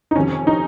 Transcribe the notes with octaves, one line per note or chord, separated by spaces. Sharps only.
D#4
F2 C3 D#3 C#4
D#4